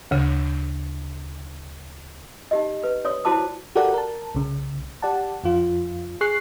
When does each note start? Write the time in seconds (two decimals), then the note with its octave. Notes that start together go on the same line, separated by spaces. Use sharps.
0.11 D2 C#3
2.51 D#4 G4 D#5
2.84 B4
3.05 C#5 D5 D#6
3.25 E4 F#4 C5 A5 D6
3.75 F#4 G4 A4 A#4 D5 F#5
3.94 A#4 A5
4.35 C2 C#3
5.02 G4 D5 F#5 A5
5.44 F2 F3 F4
6.21 G#4 C#6 F#6 C7